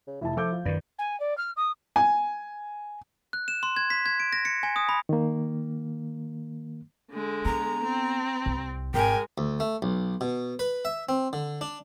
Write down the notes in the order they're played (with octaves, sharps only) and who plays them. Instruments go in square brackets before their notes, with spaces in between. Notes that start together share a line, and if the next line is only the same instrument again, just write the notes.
[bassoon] C#3
[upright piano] F1 E3 A5 [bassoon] E4
[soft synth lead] F3 [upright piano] A4 D6 G6
[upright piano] F4
[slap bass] F#2 D#3 [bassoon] B4 [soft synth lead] D5
[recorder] G#5
D5
F6
D#6
[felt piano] G#5
[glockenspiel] F#6
E7
C6
G#6
B6
G#6
D7
A#6
C#7
G#5
D#6
B5
[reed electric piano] D#3 A#3
[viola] D3 G#3
[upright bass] B3 [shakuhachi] A#5
[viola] C4
[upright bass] C2
[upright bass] G#1 [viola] G#3 [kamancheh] A#4 G#5 [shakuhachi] G5
[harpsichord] D2
A3
B1
B2
B4
E5
C4
D3
D4